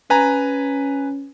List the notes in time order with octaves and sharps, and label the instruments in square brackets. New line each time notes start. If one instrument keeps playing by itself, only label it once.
[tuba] C#4 [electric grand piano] B4 G#5 A#5